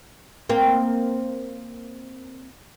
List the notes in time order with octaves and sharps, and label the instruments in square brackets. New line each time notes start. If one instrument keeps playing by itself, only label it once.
[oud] A#3 C4